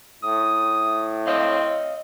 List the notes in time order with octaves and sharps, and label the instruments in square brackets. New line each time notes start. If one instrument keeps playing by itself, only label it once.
[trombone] A2 [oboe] D#6
[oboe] C4 [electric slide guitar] C#5 D#5 F5